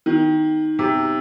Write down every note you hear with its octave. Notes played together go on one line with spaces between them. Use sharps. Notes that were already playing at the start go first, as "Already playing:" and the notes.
D#3
C3